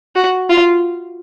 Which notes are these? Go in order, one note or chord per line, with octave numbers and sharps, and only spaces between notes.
F#4
F4